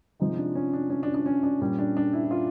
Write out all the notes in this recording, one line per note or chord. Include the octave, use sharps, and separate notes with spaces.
C3 F3 G#3 D#4
D4
C#4
D4
C#4
D4
D4
C#4
D4
A#2 G3 C#4
D4
D4
E4
E4
F4